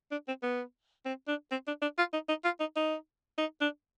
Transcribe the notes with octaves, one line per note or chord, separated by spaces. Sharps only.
D4
C4
B3
C4
D4
C4
D4
D4
F4
D#4
D#4
F4
D#4
D#4
D#4
D4